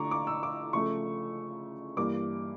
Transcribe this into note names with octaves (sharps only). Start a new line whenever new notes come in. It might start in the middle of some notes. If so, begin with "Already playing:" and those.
Already playing: D3 A3 D4 F4 A#5 C#6 D6
D6
E6
D6
C#3 F3 A3 C#6
G2 E3 A#3 D6